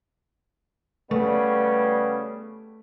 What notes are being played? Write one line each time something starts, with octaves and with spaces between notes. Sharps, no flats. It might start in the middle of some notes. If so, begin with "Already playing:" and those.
C#3 G3 A3 B3